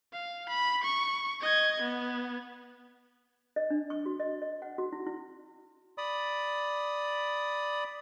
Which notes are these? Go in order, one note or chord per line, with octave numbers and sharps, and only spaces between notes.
F5
B5
C#6
D#5 G#6
B3
D#5
D4
C#6
F#4
D#5
D#5
F#5
F#4
E4
E4
D5 B5 D#6